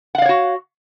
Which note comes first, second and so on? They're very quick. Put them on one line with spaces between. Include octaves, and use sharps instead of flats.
F#5 F5 D5 C#5 F#4